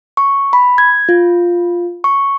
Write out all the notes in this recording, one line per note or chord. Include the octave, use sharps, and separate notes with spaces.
C#6
B5
G#6
F4
C#6